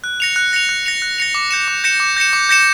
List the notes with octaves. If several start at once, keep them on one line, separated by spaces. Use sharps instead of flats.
F#6
A#6 C#7 F7
F#6
A#6 C#7 F7
F#6
A#6 C#7 F7
F#6
A#6 C#7 F7
D6
G6 A#6 C#7 E7
D6
G6 A#6 C#7 E7
D6
G6 A#6 C#7 E7
D6
G6 A#6 C#7 E7